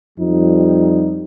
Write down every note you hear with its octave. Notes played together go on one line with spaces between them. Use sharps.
F2 F3 G3 D#4